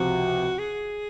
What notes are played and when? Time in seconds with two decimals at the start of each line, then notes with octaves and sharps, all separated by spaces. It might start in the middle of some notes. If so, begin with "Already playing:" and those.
Already playing: C#2 C3 F3 F#4
0.59 G#4